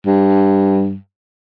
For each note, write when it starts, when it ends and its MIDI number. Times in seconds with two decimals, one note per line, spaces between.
0.06 0.96 43